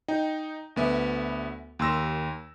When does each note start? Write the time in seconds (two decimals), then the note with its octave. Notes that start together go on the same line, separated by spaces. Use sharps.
0.08 D#4 G5
0.76 D2 B3 E5
1.79 D#2 C6 E6 A#6